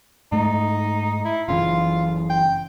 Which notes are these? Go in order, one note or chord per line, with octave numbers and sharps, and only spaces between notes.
G#2 A3 D#4
E4
F#1 C#3 E3 F4
G5